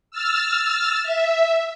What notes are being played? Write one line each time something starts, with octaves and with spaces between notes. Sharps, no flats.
E6 F6 A6
E5